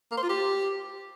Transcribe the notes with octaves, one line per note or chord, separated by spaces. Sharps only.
A#3
C5
F4
G4